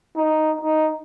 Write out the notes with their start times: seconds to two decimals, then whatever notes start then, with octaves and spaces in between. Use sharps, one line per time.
0.16 D#4
0.61 D#4